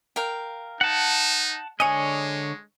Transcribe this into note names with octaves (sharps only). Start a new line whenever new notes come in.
A#4 F5 G5
D#4 F#5 A5
D3 G#3 G#4 C#5 D#5 D#6